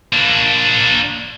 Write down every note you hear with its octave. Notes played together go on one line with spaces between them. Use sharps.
A#3 D4